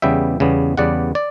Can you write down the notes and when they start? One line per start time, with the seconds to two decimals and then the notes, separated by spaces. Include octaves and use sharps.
0.02 E2 C#3 G3 B3 E5 G5
0.40 E2 C#3 G3 B3
0.77 E2 C#3 G3 B3 D5 F#5
1.15 D5